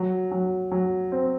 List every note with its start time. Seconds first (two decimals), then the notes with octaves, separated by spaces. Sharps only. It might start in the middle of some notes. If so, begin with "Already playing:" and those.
Already playing: F#3
0.31 F#3
0.72 F#3
1.12 C4